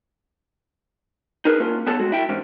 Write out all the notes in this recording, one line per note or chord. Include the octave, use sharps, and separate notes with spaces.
D#4 G#4 A#4 B4
A#3 C#4 F4
B3 G#4 A4 C#5 A5
G#3 F#4
E4 G5
E2 G#2 C#4